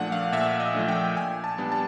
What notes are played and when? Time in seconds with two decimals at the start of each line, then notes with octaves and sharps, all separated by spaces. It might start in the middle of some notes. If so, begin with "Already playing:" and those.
Already playing: A#2 F3 A3 D4 F#5
0.12 F5
0.32 A#2 E5
0.60 D#5
0.74 F3 A3 D4
0.88 G5
1.16 A#2 G#5
1.44 A5
1.58 G3 B3 D4
1.72 A5